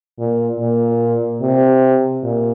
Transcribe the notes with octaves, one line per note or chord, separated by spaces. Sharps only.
A#2
A#2
C3
A#2